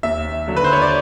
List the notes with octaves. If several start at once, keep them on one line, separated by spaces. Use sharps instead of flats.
D#2 E5
D3 F#3
B4
C5
C#5
D5